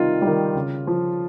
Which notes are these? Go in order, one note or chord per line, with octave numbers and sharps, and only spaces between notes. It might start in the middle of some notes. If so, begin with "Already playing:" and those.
Already playing: C3 D#3 G3 D#4 F4
D#3 G3
C#3
F3